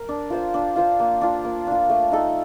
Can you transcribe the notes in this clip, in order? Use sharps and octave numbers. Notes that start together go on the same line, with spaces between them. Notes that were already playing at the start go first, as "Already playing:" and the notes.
Already playing: A#4
D4
F4 C5 F5
D4
F4 C5 F5
A#3
D4 F4
A#3
D4 F4
A3
D#4 A4